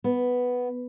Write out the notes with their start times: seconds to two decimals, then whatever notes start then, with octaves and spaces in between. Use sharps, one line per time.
0.04 B3